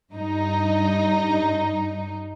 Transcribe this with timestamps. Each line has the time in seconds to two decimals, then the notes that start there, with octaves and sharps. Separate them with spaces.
0.14 G2 D#4